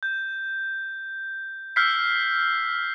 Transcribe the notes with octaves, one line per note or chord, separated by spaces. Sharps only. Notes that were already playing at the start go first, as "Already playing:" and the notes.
G6
E6 F6 G6 B6 C7